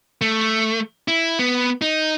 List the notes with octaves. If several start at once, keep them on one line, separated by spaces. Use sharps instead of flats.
A3
E4
B3
D#4